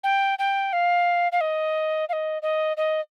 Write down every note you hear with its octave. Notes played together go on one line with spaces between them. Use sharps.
G5
G5
F5
F5
D#5
F5
D#5
D#5
D#5